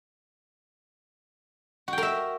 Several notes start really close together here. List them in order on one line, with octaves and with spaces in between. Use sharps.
F#4 G5 A#4 E5